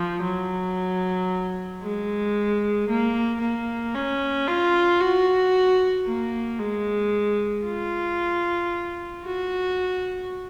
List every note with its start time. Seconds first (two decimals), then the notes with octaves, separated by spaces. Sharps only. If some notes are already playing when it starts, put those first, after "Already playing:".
Already playing: F3
0.24 F#3
1.82 G#3
2.89 A#3
3.41 A#3
3.94 C#4
4.48 F4
5.01 F#4
6.07 A#3
6.59 G#3
7.65 F4
9.25 F#4